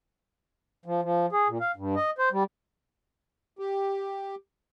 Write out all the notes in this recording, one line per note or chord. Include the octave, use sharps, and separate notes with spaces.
F3
F3
G#4
A#2
F5
G2
D#5
C5
G3
G4